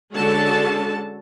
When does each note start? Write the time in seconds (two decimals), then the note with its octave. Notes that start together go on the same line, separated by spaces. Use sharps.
0.14 D3 G#3 C#4 F#4 A4 A5